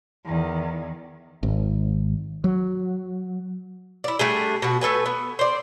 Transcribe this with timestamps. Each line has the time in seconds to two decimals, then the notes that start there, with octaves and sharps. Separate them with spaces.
0.25 E2 D#3
1.43 G#1
2.44 F#3
4.04 E4 D5
4.19 G3 A3 D4 G#4
4.62 B2 F#4
4.81 A3 A4 B4 G#5
5.06 B3
5.39 C5 D5